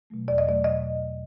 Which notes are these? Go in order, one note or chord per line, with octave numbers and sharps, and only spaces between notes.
B2 F#3 A3
E2 D5
D#5
B2 F#3 A3 D5
B2 D#5